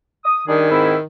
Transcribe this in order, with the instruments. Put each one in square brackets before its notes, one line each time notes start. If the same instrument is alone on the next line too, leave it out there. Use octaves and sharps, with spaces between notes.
[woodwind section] D#6
[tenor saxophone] D#3 [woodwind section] G3 D4 G#4
[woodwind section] G#2 C4 E4